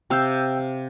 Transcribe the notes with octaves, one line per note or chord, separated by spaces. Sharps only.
C3 F5 G5 E6 G6